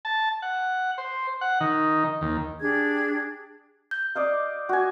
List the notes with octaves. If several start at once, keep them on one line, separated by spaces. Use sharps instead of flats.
A5
F#5
C5
F#5
D#3
D#2
D4 G4 G#4 G#6
G6
D5 D#5 F5
F#4 G#5